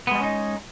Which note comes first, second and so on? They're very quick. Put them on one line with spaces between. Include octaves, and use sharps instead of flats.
B3 G#3 G3 C#4 D#4